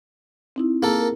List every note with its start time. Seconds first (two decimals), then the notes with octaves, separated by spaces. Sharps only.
0.56 C4 D#4 E4
0.83 A#3 G#4 A4
1.01 A#4